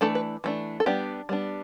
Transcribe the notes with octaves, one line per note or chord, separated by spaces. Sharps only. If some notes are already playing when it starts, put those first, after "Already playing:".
E3 A3 D4 A4
B4
E3 A3 D4
A4
G3 B3 D4 G4
G3 B3 D4